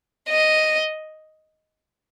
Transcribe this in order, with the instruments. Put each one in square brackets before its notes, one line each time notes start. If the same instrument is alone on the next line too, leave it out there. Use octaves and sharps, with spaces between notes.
[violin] D#5